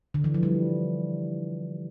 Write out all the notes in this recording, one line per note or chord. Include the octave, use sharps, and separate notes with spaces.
D3
E3
F3
G3